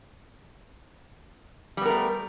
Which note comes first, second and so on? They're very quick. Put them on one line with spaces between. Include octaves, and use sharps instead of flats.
G3 B3 A#4 A3